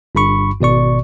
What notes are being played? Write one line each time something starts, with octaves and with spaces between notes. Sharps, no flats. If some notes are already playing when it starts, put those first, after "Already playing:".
G1 G2 B5 C#6
G#1 B2 D5 C#6